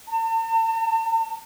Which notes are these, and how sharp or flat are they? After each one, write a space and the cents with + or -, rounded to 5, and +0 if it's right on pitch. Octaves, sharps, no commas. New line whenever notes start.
A5 +40